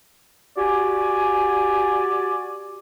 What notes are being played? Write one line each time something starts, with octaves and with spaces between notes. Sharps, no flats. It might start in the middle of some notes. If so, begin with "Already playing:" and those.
F#4 G4 D5 G#5